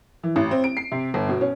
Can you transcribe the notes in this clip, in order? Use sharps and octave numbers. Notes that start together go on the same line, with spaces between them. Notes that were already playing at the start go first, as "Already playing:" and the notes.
E3
A1
C4
D7
C7
C3
G1
B2
C#4